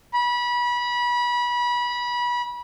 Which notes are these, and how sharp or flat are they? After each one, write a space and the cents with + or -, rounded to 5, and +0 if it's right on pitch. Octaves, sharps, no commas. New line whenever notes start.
B5 -25